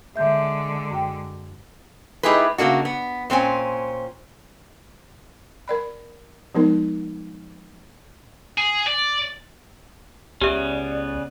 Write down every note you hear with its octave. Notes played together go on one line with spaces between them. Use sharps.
D3 G#3 E5 G6
F#2 G5
A3 D#4 E4 G4 G#4 B4
C#3 A3 A#3 D4 F#4
B3
A#2 C4 C#4 G#5
A#4 D5 B5
F3 G#3 B3 D#4 A#4
G#4
D5
C#2 C#3 B3 C#4 G4 D5 E5